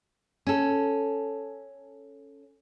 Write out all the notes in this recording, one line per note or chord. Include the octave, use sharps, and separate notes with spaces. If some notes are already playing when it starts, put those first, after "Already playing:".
C#4 A4